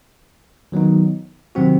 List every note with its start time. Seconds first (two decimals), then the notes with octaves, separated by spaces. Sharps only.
0.72 D#3 F#3 B3 D#4
1.55 C3 D#3 F#3 C4 F#4